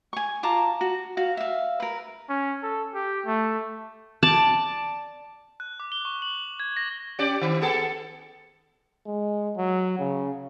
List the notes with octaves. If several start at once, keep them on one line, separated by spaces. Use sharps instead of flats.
G#5 C#6
F4 A5 A#5 D6
F#4
F#4 F5
E5 F5
A#4 B4
C#4
A4
G4
A3
D5 A5
F#6
D6
G7
C#6
F#7
G#6
A#6
C#4 G4 D5
D#3
B3 G#4 A4
G#3
F#3
C#3